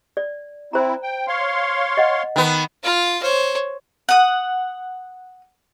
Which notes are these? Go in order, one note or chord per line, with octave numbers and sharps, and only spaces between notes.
D5
C4 E4 C5 A#5
G5
C#5 F5 C6
D#5 F#5
D#3 B3
F4 F5
C5 C#5
F#5 D#6